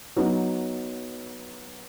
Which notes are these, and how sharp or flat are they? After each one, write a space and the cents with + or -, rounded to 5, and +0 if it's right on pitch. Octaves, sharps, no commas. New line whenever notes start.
F#3 +0 B3 -15 D#4 +0